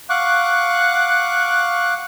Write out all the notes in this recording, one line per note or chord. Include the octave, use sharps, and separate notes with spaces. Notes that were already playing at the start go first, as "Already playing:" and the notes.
F5 F#5 C#6 D6 F#6